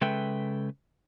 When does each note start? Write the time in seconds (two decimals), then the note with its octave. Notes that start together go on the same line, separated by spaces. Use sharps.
0.01 C#3 G#3 A4 B4 E5 G5